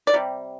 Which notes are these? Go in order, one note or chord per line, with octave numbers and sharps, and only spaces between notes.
D5
C3 G3